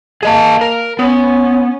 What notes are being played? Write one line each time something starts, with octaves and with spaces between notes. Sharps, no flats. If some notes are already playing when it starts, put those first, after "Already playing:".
A#3 G#4 D#5 A5
A#4
B3 C#4